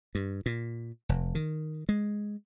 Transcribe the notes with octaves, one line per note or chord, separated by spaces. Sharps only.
G2
A#2
F1
D#3
G#3